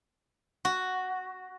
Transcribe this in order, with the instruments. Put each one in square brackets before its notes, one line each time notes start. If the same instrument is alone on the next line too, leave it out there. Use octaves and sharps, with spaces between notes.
[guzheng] F#4